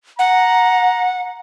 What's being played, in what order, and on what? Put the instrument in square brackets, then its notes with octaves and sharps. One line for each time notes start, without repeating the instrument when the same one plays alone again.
[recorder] F#5 [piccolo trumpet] A#5